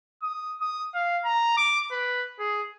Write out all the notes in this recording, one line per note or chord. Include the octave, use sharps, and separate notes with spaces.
D#6
D#6
F5
A#5
D6
B4
G#4